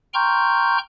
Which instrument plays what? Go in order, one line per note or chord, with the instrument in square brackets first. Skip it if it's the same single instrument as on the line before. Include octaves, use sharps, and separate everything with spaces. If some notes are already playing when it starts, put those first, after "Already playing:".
[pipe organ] G5 A#5 C6 C#6 F6 G6